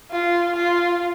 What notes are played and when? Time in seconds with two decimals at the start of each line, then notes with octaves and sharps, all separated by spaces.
0.11 F4
0.56 F4